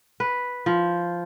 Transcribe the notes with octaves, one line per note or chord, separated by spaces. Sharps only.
B4
F3